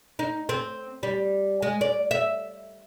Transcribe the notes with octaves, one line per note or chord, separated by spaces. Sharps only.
D#4
C4
G3
G#3
D5
E5